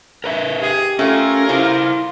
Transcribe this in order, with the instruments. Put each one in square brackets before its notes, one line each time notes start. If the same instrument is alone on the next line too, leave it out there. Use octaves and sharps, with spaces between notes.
[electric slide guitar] A#4 B4 E5
[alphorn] G4 [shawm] G#4
[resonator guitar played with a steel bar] A3 F4 [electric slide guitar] C#4 [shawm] A#4
[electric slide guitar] E4 C5 [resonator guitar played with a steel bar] F4